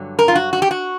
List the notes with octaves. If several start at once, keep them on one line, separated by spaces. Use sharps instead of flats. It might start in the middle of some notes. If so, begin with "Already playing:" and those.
Already playing: G2 D3 F#3
A#4
F4
F#4
F#4
G4
F#4